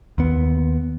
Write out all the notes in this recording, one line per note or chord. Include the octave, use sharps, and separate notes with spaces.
D#2 B3